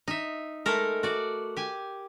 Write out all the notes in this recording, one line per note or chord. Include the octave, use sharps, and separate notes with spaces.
D#4 E5
G#3 A3 A4 A#4
F#4 D5
G4 G#5